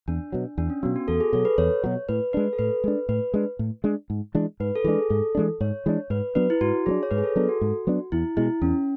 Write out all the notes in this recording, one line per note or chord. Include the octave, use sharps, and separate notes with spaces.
E2 D4
B2 F#3
E2 D4
C#4
B2 F#3 B3
F#4
E2 A4
G#4
B2 F#3 A4
B4
E2 C#5
B2 F#3
A2 B4
G#3 D4 B4
A4
A2 B4
G#3 D4
A2 B4
G#3 D4
A2
G#3 D4
G#2
E3 G#3 D4
G#2 B4
A4
E3 G#3 D4 G#4
G#2 A4
E3 G#3 D4
G#2 C#5
E3 G#3 D4
G#2 B4
F#3 B3 D4 B4
E4
G#2 F#4
F#3 B3 D4 G#4
C#5
G#2 B4
G#4
A4
F#3 B3 D4 A4
F#4
G#2
F#3 B3 D4
E2 E4
B2 G#3 E4
E2 C#4